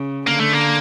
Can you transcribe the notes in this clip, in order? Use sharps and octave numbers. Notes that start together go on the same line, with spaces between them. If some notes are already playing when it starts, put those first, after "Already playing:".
Already playing: C#3
D3 A#3
A3
A#3